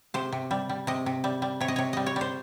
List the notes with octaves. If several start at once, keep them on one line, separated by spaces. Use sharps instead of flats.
C3 C5
C3
G3
G3
C3 D#5
C3
G3
G3
C3 C#5
D#5
C3 C#5
G3 D#5
C#5
G3 C5